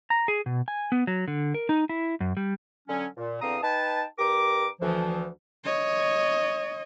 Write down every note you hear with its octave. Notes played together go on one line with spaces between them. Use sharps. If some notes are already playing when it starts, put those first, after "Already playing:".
A#5
G#4
B2
G#5
B3
F#3
D3
A#4
D#4
E4
F#2
G3
D3 F#3 C#4
A#2
E2 D3 C4 F5 A#5 D#6
D#4 B4 G5 A5
G2 G4 A#4 A#5 D6
D2 E3 F3
C#5 D#5